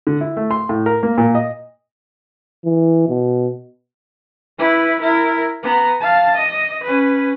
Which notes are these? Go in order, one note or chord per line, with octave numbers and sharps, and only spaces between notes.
D3
E4
A3
C6
A2
A#4
A#3
A#2
D#5
E3
B2
E4 B4
E4 A#4
B3 A#5
F5 A5
D#5
C#4 B4